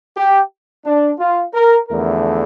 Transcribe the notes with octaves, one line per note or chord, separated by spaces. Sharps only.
G4
D4
F4
A#4
E2 D3 F3 A3 A#4